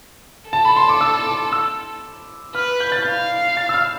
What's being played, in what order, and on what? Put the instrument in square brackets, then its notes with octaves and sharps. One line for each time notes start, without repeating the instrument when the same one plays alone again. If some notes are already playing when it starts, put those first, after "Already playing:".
[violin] A4 [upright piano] A5
[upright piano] B5
C6
D6
E6
D6
E6
[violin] B4 [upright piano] F6
[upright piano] G6
A6
[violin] F5 [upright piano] G6
[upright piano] A6
E6
F6